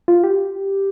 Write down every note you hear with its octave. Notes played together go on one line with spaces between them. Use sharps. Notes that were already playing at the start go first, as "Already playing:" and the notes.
F4
G4